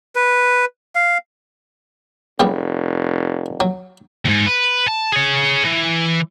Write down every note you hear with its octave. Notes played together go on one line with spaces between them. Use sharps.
B4
F5
F1 C#3 G3 B3
F#3
D#2 G#2
B4
A5
G#4 C#5
E3